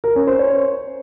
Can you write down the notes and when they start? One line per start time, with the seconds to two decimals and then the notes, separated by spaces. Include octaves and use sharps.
0.04 A#4
0.16 C#4
0.27 C5
0.39 C#5